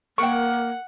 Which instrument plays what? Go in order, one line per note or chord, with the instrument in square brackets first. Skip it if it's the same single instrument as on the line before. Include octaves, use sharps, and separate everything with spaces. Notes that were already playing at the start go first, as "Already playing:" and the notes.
[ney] A#3 [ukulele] A#4 G5 [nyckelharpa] F#5 [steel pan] C#6